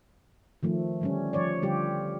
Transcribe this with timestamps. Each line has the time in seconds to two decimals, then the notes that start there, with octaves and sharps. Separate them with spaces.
0.63 D#3 F3 A3
1.01 D3 G3 C#4
1.33 F3 C#5 D5
1.62 D3 G3 F4 G4